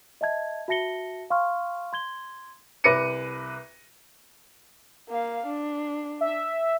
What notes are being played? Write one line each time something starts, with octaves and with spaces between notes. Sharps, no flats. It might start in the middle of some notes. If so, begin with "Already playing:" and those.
D#5 E5 A5 G#6
F#4 E5 A5 A#6 C#7 G7
F5 C6 C#6 F6
C6 G#6 G7
C2 B4 D6 A#6 C#7 D#7
A#3 F5
D4
E5